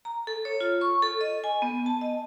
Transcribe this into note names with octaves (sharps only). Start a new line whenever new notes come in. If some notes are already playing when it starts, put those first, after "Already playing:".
A#5
A4
C#5
F4
C#6
A4
D#5
G#5
B3
A5
D#5